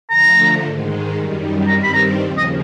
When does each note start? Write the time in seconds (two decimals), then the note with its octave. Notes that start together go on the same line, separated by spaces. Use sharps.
0.09 D3 F3 A3 A#5
0.63 G#2 D#3 G#3
1.15 F#2 D#3 G3
1.67 G2 D#3 G3 C4 A#5
1.83 B5
1.94 A#5
2.20 D#2 C#3 F3
2.37 D#5